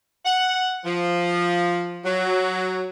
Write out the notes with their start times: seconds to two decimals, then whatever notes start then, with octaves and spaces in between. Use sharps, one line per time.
0.25 F#5
0.85 F3
2.05 F#3